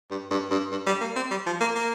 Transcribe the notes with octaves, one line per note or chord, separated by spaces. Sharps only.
G2
G2
G2
G2
G3
A#3
C4
G3
F3
A#3
A#3